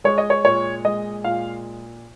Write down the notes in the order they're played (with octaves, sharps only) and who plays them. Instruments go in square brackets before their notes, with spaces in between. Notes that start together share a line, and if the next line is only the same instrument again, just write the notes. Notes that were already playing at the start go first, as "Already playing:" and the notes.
[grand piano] G#3 C#5
D#5
C#5
A#2 C#5
G#3 D#5
A#2 F5